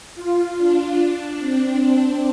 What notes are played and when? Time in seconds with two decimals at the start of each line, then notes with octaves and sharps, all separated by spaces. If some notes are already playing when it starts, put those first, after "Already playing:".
0.15 F4
0.57 D4
1.39 C4